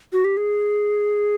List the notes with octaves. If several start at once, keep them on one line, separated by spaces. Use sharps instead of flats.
F#4
G4
G#4